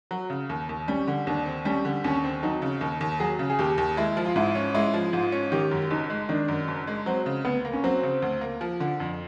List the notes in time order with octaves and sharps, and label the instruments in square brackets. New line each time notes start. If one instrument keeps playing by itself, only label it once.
[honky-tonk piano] F#3
C#3
D#2
D#2
[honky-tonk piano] G3 [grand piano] C#4
[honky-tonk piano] D3
[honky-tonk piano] D#2 [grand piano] D4
[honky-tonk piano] C4
[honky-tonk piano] G3 [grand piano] C#4
[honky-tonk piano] D3
[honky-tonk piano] D#2 [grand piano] C#4
[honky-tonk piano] C4
[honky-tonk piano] F#3 [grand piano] D#4
[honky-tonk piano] C#3
D#2
D#2
[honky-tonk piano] F#3 [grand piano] G#4
[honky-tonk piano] C#3
[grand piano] G#4
[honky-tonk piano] D#2 [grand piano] G4
[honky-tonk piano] D#2
[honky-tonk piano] G#3 [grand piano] E4
[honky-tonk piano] F3
[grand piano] F4
[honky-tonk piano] G#2 [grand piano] E4
[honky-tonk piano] C#4
[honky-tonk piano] G#3 [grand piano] E4
[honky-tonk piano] F3
[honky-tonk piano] G#2 [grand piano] F4
[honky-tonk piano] C#4
[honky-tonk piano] D#3 [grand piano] G4
[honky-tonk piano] F#2
[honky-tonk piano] F#1 [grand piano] D#4
[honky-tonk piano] G#3
[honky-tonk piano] D#3 [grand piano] D4
[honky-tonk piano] F#2
F#1
G#3
[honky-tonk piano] F#3 [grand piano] C4
[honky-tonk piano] C#3
[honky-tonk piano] D2 [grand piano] B3
[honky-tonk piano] A#3
[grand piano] C#4
[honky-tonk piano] F#3 [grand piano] C4
[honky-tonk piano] C#3
D2
A#3
F3
D3
F2